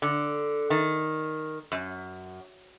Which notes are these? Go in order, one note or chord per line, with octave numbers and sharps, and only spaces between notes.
D3
D#3
F#2